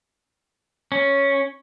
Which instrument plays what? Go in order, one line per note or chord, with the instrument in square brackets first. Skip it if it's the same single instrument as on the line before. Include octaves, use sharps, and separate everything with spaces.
[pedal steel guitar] C#4